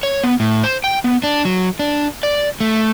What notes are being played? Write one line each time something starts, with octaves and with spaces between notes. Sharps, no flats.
C#5
B3
A2
C5
G5
B3
D4
F#3
D4
D5
A3